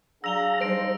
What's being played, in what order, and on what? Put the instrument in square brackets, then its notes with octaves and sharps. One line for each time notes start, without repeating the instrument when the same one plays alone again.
[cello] F#3 [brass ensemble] D4 G#4 F5 [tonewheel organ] A#5 [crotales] E6 F7 G7
[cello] G3 D#4 [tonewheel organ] C5 [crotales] A#6 D7